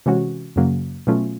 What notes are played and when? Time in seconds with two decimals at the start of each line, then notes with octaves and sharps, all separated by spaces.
0.06 C3 E3 G#3 C#4 F#4
0.56 F#2 C#3 F#3 A#3
1.07 B2 F#3 A3 C#4 F4